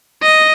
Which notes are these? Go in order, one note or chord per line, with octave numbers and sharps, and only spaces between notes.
D#5